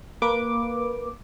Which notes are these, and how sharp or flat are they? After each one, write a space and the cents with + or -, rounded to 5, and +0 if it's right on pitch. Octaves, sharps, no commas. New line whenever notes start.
A#3 +0 B4 -15 D6 +0